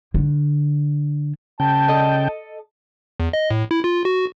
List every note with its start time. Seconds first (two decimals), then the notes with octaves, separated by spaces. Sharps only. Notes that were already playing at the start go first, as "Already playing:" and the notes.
0.14 D3
1.60 C#3 G5 A5
1.88 A4 D#5
3.20 E2
3.33 D#5
3.51 A2
3.71 E4
3.84 F4
4.05 F#4